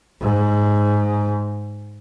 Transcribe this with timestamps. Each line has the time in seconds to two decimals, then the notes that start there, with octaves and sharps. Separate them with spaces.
0.21 G#2